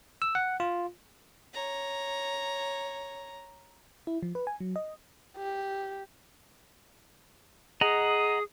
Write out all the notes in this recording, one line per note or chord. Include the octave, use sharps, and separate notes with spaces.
E6
F#5
F4
C#5 A#5
E4
F3
B4
G#5
F#3
D#5
G4
G#4 D#5 F#5 A#5